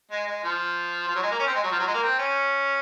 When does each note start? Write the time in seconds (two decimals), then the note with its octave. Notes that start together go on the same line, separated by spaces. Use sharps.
0.11 G#3
0.27 G#3
0.43 F3
1.07 F3
1.15 F#3
1.23 G#3
1.31 A#3
1.39 C#4
1.47 C4
1.55 G#3
1.63 F#3
1.71 F3
1.79 F#3
1.87 G#3
1.94 A#3
2.03 C4
2.19 C#4